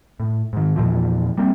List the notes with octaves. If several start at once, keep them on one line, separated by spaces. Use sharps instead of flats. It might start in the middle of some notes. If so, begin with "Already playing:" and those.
A2
G#2 D#3
E2 A#2 E3 F3
G3 A#3 C4